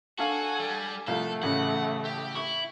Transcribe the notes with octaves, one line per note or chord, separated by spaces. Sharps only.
D4 F#4 A4 F5 G#5
G3
C2 F3 A3 A4 F5
A1 C#3 F#5
G4
E4 C#6